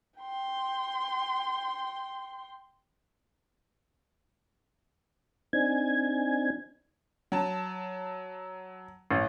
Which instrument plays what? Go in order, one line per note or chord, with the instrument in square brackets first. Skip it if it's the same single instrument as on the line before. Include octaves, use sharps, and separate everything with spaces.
[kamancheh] G5 C6
[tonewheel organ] C4 D4 D#4 G#5 G#6
[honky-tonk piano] F#3 A5
[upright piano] A1